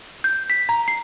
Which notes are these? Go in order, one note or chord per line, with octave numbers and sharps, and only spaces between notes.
G6
B6
A#5
C7